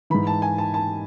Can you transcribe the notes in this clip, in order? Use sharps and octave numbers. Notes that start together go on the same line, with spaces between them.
G#2 E3 B5
A5
G#5
A5
A5